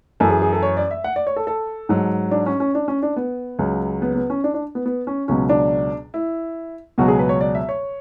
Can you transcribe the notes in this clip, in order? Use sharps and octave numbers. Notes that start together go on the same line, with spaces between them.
F#2 E3 A4
G#4
G#4
A4
C#5
D5
E5
F#5
D5
C#5
A4
A4
G#2 F#3
D4
C#4
C#4
D4
C#4
D4
B3
C#2 C#3 F#3
B3
B3
C#4
D4
D4
B3
B3
C#4
C#2 B2 F#3 C#4
D4
E4
C#2 B2 F#3 F#4
G#4
B4
C#5
D5
E5
C#5